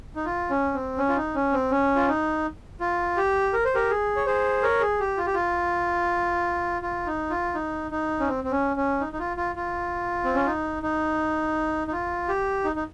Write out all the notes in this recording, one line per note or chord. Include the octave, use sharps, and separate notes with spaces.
D#4
F4
C#4
C4
C#4
F4
D#4
C#4
C4
C#4
F4
D#4
F4
G4
A#4
C5
G4 A#4
G#4
C#5
G#4 C5
A#4 C#5
G#4
G4
F4
G4
F4
F4
D#4
F4
D#4
D#4
C#4
C4
C4
C#4
C#4
D#4
D#4
F4
F4
F4
C4
C#4
D#4
D#4
D#4
F4
G4
D#4
D#4